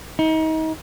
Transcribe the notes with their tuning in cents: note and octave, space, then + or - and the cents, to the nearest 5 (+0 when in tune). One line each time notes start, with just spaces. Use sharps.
D#4 +30